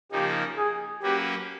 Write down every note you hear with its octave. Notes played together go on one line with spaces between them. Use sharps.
C#3 F3 A#3 D#4 G4
G#4
F#3 A#3 C#4 F#4 G4 B4